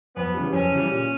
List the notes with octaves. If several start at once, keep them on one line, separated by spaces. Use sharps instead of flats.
F2 B3
C#3 E3 G3
F2 C#4
C#3 E3 G3
A#2